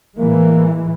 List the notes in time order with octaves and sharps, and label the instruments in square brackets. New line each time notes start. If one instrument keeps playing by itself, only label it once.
[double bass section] A2 E3 G#3 [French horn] A#3